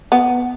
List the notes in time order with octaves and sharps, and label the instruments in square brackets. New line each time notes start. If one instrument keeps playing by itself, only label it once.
[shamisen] B3